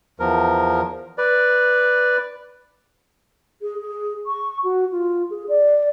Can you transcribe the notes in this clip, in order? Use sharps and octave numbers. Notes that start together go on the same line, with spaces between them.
E2 F3 A#4
B4 D5
G#4
G#4
C#6
F#4
F4
G#4
D5